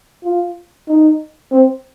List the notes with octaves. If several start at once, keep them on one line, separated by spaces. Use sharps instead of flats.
F4
D#4
C4